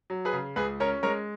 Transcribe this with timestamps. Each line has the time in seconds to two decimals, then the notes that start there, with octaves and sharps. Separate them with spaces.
0.10 F#3
0.25 G#4 B4
0.33 C#3
0.56 C#2 G#4 B4
0.80 C#4 A#4 C#5
1.03 G#3 A#4 C#5